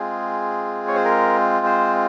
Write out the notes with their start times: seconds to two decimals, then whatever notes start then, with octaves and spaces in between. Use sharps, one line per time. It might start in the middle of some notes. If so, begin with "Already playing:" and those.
Already playing: G#3 C4 F4 G#4
0.88 C#5
0.96 C5
1.04 A#4
1.66 C5